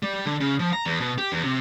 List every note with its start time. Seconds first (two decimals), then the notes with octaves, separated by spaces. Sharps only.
0.03 G3
0.26 D3
0.40 C#3
0.59 F3
0.73 A#5
0.86 E2
1.00 B2
1.18 G4
1.32 E2
1.44 C3